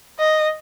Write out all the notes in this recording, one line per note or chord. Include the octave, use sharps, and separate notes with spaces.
D#5